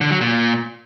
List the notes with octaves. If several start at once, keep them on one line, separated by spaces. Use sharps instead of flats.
D3
F#3
A#2